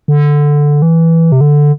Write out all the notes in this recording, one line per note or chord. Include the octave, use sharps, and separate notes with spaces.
D3
E3
C3
D3